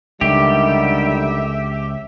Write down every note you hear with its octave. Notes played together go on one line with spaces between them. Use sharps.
C#2 D3 D#3 G3 G4 E5